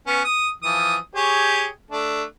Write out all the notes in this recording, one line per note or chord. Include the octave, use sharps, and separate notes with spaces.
B3 C#4
D#6
E3 F3 D#6
G4 G#4 C#5
A3 D4